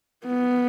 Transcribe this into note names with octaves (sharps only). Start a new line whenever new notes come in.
B3